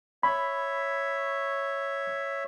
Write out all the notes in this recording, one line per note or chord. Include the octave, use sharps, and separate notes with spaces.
C#5 E5 B5